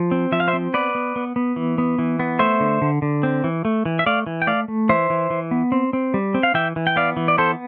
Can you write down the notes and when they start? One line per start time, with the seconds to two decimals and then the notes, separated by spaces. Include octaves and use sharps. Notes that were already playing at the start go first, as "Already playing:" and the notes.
Already playing: F3
0.11 C4
0.32 F3 E5
0.40 F5
0.48 C5 E5
0.53 C4
0.74 B3 B4 D5
0.95 B3
1.16 B3
1.36 B3
1.56 E3
1.78 B3
1.99 E3
2.20 B3
2.39 A3 C5 E5
2.60 D3
2.82 D3
3.02 D3
3.23 C4
3.44 E3
3.65 A3
3.85 E3
3.99 E5
4.06 A3 D5 F5
4.26 E3
4.42 G5
4.47 A3 D5 F5
4.68 A3
4.89 E3 C5 E5
5.10 E3
5.30 E3
5.51 B3
5.72 C4
5.93 C4
6.14 G3
6.34 C4
6.43 F5
6.54 E3 E5 G5
6.76 E3
6.87 G5
6.96 B3 D5 F5
7.17 E3
7.28 D5
7.38 B3 A4 C5